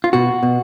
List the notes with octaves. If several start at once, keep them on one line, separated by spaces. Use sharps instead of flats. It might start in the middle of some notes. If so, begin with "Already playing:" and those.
F4
B2 F#4
B2